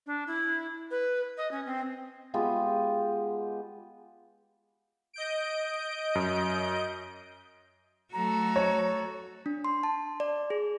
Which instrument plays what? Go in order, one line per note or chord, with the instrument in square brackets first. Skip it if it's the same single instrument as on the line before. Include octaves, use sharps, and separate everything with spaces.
[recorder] D4
E4
B4
D#5
C#4
C4
[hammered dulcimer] G#3 B3 F4 G4
[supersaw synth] D#5 G6 D7
[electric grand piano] F#2
[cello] F#3 A3 [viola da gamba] F#4 A4 [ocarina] A#5
[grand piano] C#5
[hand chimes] D4
C6
A5
D5
G#4